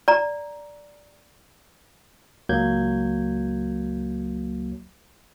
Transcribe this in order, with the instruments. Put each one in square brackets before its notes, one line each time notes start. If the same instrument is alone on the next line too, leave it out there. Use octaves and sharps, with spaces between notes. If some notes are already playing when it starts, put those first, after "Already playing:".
[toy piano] D5 A#5
[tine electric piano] C#2 F#3 A#3 G6 G#6